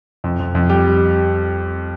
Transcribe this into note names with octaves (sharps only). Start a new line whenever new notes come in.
F2
F2
F2
G3 G4
G3